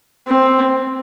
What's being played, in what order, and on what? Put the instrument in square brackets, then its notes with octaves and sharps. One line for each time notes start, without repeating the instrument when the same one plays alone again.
[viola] C4